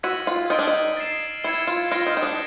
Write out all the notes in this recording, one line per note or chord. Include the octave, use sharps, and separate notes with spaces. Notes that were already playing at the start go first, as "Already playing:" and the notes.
F#4 E6 G#6 B6 D#7 F#7
F4
D#4 F6 A6 D7 G7
D4
D#4
A6 C7 E7
E4 G#6 C#7 E7 G7
F4
F4 F6 A#6 D7 G7
D#4
D#4
D4